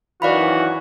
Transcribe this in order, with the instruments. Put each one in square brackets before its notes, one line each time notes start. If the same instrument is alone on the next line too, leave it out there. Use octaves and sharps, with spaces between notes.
[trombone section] F#2 D#3 E3 [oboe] F#4 [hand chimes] D5 F5 B5